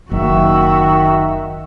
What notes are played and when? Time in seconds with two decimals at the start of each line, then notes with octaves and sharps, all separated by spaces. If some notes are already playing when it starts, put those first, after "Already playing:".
0.11 F#1 D#3 F#4 E5